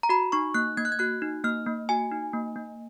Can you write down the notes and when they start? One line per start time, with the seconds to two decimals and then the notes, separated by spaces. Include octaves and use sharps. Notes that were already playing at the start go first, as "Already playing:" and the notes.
0.03 A#5
0.09 F#4 B5
0.32 D#4 C#6
0.54 A#3 F#6
0.77 A#3 G#6
0.85 F#6
0.92 G#6
0.99 F#4 F#6
1.22 D#4
1.44 A#3 F6
1.66 A#3
1.89 F#4 G#5
2.11 D#4
2.33 A#3
2.56 A#3